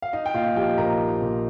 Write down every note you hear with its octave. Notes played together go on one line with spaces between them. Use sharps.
F5
D#4 D#5
G5
A#2 F4 F5
F3 G4 G5
A#1 A#4 A#5
D#4
A#2